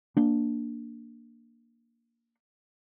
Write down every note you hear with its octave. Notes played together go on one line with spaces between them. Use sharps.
A#3 D4